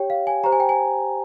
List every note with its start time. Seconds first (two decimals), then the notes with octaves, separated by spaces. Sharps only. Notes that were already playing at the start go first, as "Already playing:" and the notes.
Already playing: G4 C#5 G5
0.10 F5
0.27 G#5
0.44 G4 C5 A#5
0.52 G#5
0.60 G5
0.69 G#5